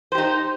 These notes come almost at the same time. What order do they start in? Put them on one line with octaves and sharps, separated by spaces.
C5 G4 D#4